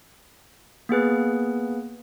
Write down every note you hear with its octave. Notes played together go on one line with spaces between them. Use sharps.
A#3 B3 G#4 B4